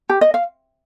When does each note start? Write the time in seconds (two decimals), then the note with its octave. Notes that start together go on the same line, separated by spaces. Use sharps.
0.09 G4
0.21 D#5
0.34 F5